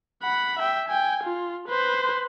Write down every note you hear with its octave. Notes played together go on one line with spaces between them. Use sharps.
F#5 B5
E5 G5
G5 G#5
F4
B4 C5